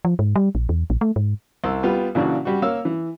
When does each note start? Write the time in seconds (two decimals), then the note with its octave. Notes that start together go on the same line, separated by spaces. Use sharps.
0.05 F3
0.19 G#2
0.36 G3
0.55 A#1
0.69 E2
0.90 A#1
1.01 A3
1.16 G#2
1.64 C2 E6
1.83 G3 B3 F4
2.15 A#2 C#3 E3 D4 F#4
2.45 G3 F#4
2.62 A#3 C#5 F5 E6
2.85 E3